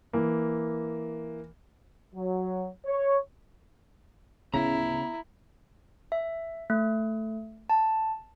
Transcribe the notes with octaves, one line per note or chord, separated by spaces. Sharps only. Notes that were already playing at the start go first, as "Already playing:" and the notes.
E3 A#3
F#3
C#5
D1 C#3 B3 C#4 E4 A#5
E5
A3
A5